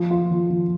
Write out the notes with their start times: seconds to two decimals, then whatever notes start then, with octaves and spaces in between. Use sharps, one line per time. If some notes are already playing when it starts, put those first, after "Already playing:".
Already playing: F3
0.10 F4
0.31 F3
0.50 F3